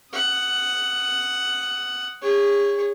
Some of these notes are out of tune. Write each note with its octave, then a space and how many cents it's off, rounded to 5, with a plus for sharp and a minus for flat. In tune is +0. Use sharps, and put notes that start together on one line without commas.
F#5 +10 D#6 +0
G#4 -40 C#5 +0